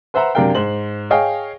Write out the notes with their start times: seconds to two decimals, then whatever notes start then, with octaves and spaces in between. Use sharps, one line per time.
0.14 B4 C5 E5 F#5 A#5
0.35 F#2 C3 D4 A#4 F5 G5
0.55 G#2 C5 F#7
1.10 G#4 C#5 D#5 F5 G5 G#5